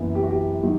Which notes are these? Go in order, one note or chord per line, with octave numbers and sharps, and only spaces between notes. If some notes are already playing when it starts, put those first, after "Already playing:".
Already playing: F#1 F#2 E3 B3
G4
F#4
G4
D#3 F#3